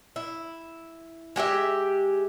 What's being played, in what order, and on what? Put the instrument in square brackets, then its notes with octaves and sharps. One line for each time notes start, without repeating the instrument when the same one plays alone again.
[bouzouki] E4
G#3 G4 G#4 E5